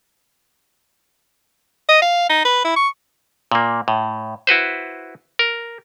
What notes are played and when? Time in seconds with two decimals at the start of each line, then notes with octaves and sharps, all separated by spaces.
1.89 D#5
2.02 F5
2.29 D#4
2.45 B4
2.65 E4
2.76 C#6
3.52 A#2 A#3
3.88 A2
4.47 E4 F#4 B4 C5
5.39 A#4